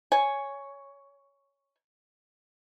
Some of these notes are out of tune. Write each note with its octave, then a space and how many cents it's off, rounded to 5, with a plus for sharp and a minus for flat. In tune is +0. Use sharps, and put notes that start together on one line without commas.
C#5 +5 G#5 +0